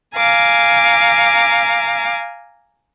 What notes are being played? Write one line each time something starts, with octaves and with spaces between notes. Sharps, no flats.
F5 G#5 A#5 D6